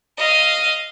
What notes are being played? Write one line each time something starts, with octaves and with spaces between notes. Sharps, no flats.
D#5 F5